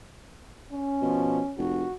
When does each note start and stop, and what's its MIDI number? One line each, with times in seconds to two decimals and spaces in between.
0.73 1.56 61
1.02 1.41 47
1.02 1.40 53
1.58 1.85 29
1.58 1.95 66